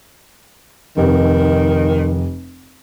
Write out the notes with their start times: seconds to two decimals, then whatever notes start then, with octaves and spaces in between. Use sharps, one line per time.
0.97 F1 D#3